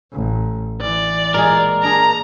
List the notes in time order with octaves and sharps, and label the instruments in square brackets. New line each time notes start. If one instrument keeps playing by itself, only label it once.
[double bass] A1
[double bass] E3 [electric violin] D5
[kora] A#2 G#3 G#4 [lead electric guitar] A#4
[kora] D4 G#4 [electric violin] A#5